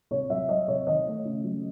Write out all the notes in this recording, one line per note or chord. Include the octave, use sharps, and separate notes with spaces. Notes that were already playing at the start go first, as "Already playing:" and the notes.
C3 C#5
F#3 E5
F#3 D#5
C3 C#5
D#3 D#5
A3
C#3
F#3